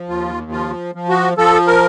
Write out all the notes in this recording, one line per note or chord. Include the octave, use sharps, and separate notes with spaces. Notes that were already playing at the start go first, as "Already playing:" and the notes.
Already playing: F3
D#2 F4
F3 F4
F3
F#4
F3 A4
A#4